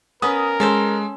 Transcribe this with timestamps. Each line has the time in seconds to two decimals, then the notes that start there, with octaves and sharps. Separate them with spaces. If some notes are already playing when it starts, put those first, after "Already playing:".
0.22 B3 C#4 A#4 D#6
0.60 G#3 C#4 A4 C5